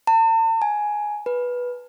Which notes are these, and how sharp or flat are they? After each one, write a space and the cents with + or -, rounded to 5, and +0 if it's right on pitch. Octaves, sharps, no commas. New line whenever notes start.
A5 +45
G#5 +10
B4 -10